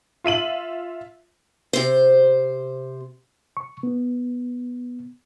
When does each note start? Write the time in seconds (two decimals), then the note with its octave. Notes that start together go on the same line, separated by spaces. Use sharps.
0.24 F4 E5 D#7 F#7
1.73 C3 C5
3.57 C#6
3.83 B3